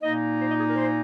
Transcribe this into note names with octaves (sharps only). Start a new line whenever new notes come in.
A#2 A#3 D#4 D#5
C5
D#5
G#4
A#4
C5